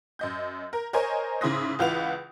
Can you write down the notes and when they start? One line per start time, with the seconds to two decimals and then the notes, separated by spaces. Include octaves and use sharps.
0.19 F#2 D#5 G6
0.73 A#4
0.93 A#4 C5 C#5 D#5 G#5
1.41 G#2 C#3 E4 C6 D#6 A#6
1.79 C#2 E3 F4 B4 F#5 F7